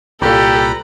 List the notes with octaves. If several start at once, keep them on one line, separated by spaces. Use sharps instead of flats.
C2 A#2 G4 A4 B4 A#5 B5